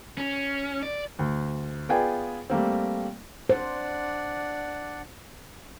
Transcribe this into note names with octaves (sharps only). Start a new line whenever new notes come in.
C#4
D5
D2
B3 F4 G#4 D5 G5 G#5
G3 A3 A#3 C4
D4 C5 D5 F#5